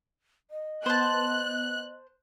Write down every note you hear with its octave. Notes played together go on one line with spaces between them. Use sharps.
D#5
B3 C5 A5 F#6